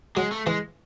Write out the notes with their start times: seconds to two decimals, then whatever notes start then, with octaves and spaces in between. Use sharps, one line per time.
0.16 F#3 G#3
0.32 A3
0.47 E3 G#3